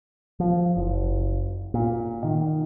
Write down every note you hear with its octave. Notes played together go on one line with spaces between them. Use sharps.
F3
F#1
A#2
D#3